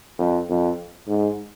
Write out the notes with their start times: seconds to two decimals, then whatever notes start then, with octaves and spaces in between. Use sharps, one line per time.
0.18 F2
0.49 F2
1.07 G#2